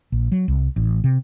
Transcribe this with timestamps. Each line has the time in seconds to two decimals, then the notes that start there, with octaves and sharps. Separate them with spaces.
0.12 A#1
0.32 F#3
0.48 C2
0.76 A1
1.04 C3